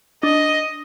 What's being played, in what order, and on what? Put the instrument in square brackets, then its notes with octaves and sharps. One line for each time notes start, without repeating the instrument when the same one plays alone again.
[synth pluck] D4 [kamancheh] D#5